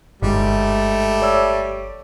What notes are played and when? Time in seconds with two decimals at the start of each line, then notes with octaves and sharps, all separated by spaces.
0.22 G1 G#2 G3 A3
1.22 C#5 D5 E6